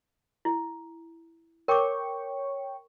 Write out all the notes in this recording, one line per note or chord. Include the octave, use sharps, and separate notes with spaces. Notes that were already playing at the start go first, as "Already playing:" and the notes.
E4
A#4 C#5 G5 C#6 D6